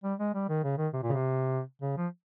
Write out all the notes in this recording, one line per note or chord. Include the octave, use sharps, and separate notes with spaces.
G3
G#3
G3
D#3
C#3
D#3
C3
A#2
C#3
C3
C#3
F3